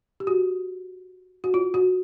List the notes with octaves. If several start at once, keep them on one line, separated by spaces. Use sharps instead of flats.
G4
F#4
F#4
F4
F#4